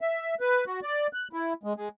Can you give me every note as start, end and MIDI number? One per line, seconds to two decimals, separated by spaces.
0.01 0.35 76
0.41 0.64 71
0.67 0.80 66
0.83 1.07 74
1.13 1.28 90
1.33 1.53 64
1.63 1.73 56
1.76 1.88 56